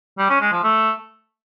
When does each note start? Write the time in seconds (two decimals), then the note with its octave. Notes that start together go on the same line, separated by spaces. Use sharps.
0.18 G3
0.29 C#4
0.41 G#3
0.52 F3
0.64 A3